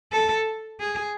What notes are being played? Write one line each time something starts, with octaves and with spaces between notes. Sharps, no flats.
A4
G#4